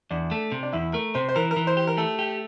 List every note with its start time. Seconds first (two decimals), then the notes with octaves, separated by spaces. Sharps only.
0.10 E2 D4
0.31 A3
0.52 C3
0.63 D4
0.73 E2 E4
0.93 A3 A#4
1.15 C3 C5
1.29 C5
1.36 E3 A#4
1.51 A#4
1.57 E3
1.67 C5
1.77 G4
1.87 A#4
1.97 A3 A4
2.19 G4